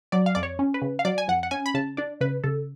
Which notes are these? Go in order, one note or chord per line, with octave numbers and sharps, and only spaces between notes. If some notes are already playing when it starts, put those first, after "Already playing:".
F#3 D5
F5
F2 D5
C#5
C#4
B4
C#3
F5
F#3 D5
G#5
F2 F#5
F#5
C#4 G#5
B5
C#3 A5
D4 D5
C#3 B4
C#3 A4